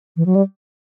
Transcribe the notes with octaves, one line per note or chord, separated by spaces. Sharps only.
E3
F#3
G3